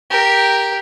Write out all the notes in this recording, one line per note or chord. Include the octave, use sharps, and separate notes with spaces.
G4 A#4